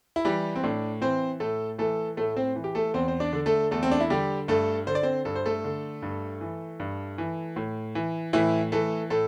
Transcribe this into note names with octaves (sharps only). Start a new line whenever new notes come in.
E4
E3 G3 G4
C4
A2 D4
E3 C4 C5
A2 A3 A4
E3 A3 A4
A2 A3 A4
C4 C5
E3
G4
A3 A4
E2 C4 C5
C5
D4 D5
D3
A3 A4
E2 A3 A4
C4
D4
E4
D3 G3 G4
G2 A3 A4
D3 C5
D5
C4 C5
G2 A4
C5
A3 A4
D3
G2
E3
G2
E3
A2
E3
A2 E3 E4
E3 A3 A4
A2 A3 A4